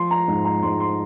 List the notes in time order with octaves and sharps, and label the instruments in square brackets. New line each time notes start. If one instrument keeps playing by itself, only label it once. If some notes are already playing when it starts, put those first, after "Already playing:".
Already playing: [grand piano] F3 C6
A#5
G#2
A#5
G#2 C6
C6